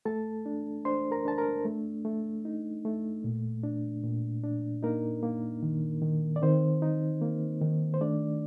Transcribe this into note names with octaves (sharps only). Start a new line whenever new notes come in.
A3 A4 A5
D4
D4 C5 C6
A#4 A#5
D4 A5
A#4 A#5
A3
A3
D#4
A3
A#2
D4
A#2
D4
A#3 D#4 A#4
A#3
D#3
D#3
D5
D#3 C4 C5
D#4
A#3
D#3
C5
A3 D4 D5